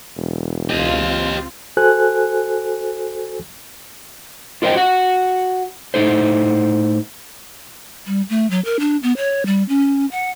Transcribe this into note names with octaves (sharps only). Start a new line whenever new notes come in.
E1
C#2 C4 F4 G4 D#5
F#4 A4 C5 G#5 F#6
F4 A#4 C5 D#5 G5
F#4 F#5
A2 D#4 A4 C5
G3
A3
F#3
A#4
D4
B3
C#5
G3
C#4
F#5